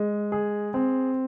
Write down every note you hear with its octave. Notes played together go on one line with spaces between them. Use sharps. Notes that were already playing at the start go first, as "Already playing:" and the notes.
Already playing: G#3
G#4
C4